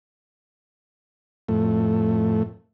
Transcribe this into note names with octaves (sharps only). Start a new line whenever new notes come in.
F2 A2 A3